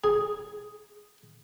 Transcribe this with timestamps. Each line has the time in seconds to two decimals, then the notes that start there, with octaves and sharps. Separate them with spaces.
0.04 G#4